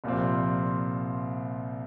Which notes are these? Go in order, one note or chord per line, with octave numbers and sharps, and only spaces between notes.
C2 A#2 F3 C4